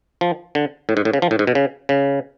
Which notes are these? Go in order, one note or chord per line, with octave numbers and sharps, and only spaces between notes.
F3
D3
A2
G#2
A2
C#3
F3
A2
G#2
B2
C#3
C#3